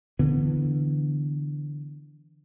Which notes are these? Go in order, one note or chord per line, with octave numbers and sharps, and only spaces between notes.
D3 E3 B3